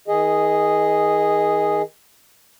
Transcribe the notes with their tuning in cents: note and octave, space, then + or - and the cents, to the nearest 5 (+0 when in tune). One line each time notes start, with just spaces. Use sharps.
D#3 +30 G#4 -5 D#5 +0